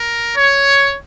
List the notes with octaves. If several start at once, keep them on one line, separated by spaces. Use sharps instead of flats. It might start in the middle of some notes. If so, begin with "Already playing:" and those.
Already playing: A#4
C#5